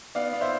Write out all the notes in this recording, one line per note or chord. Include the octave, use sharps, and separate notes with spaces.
B3 D5 F5
B3
C5 E5